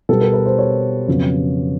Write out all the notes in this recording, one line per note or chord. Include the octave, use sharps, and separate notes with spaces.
B2 G3 B3 A4
A#4
B4
C5
C#5
F2 C#3 F#3 B3